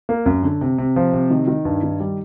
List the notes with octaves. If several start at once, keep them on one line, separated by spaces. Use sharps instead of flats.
A#3
F#2
D3
C3
C3
F3
C3
D#3
D#3
G2
D#3
G3